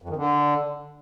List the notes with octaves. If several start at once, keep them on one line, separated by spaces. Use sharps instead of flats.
F2
D#3
D3